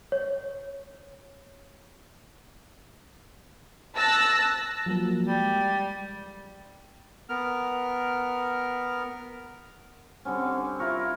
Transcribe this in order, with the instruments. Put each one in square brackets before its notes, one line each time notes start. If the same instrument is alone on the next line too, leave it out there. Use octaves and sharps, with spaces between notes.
[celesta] C#5
[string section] A5 E6 F#6 A#6
[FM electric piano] F3 F#3 A#3
[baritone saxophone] G3 [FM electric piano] G#3
[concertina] B3 A#4 F6
[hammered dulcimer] D3 G3 C4 C#4
C4
E4 F4 A#4 C#6